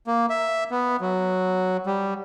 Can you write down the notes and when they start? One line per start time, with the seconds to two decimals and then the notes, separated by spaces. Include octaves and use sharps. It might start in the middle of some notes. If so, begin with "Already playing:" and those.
0.07 A#3
0.30 E5
0.71 B3
1.01 F#3
1.86 G3